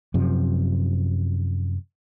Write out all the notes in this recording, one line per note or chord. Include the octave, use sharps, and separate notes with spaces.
F#2 C3 F3